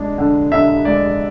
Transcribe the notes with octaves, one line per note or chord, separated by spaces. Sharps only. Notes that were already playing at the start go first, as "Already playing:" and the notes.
Already playing: G#3 D4
D3
D3 E5
G#3 D5